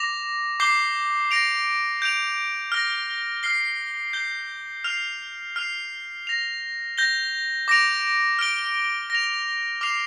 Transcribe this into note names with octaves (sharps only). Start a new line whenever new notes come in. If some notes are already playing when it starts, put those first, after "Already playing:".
Already playing: D6 A#6 F7
D6 G6 C7 G7
A#6 D7 F7
G6 D7 F7
F6 A#6 G7
F6 C7 G7
G6 C7 G7
F6 C7 F7
F6 C7 F7
A#6 F7
G6 A#6 G7
D6 A#6 D7 F7
F6 D7 G7
A#6 F7
D6 F6 C7 F7